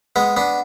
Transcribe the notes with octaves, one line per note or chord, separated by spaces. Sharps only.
G#3 B3
B3 D4